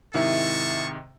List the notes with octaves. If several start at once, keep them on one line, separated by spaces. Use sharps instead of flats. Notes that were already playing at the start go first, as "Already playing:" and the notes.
G#2 C3 D#3 E4 G#4 E5 A5 C#6